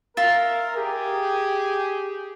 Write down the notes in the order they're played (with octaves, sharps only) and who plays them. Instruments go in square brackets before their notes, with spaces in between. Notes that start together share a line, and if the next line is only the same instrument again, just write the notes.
[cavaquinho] F4 E5 [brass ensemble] A#4
[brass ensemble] G4 G#4